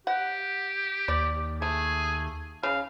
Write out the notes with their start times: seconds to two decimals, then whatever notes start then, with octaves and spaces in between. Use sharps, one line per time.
0.07 G4 F#5
1.08 D#2 D5
1.62 A3 G#4
2.63 C#3 F5